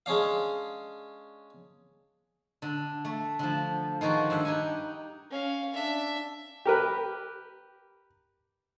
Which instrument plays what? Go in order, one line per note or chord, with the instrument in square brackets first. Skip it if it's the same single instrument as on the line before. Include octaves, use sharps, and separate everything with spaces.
[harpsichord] G#3 C#4 D4 F5
[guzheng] D3
A3
D3 F3
D#3 F3 F#4 G#4 A#5
G2 E5 F#5
D#4 G4 B4 G#5
[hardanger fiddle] C#4 F5
D4 E5
[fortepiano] G4 A#4 B4